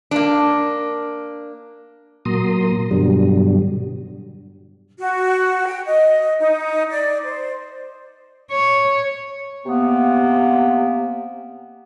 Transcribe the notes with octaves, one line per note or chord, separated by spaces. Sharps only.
A#3 D4
A#2 F#3 A#3 A#5 C6 D#6
G2 B2 D3 F#3 G3
F#4
G5
D#5
D#4
D5
C5
C#5
C3 A#3 B3